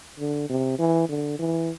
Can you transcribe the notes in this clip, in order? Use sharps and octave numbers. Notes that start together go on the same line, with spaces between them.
D3
C3
E3
D3
E3